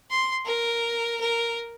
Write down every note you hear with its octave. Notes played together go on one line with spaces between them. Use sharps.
C6
A#4
A#4